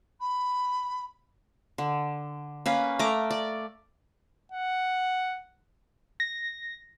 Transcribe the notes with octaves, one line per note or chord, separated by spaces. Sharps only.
B5
D3
A#3 C#4 B4
A3 A#4 A#5 D6
D5
F#5
A#6